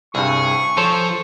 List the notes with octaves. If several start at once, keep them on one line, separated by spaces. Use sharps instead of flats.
C2 G2 G#4 C#6
F3 A4 C5 C#5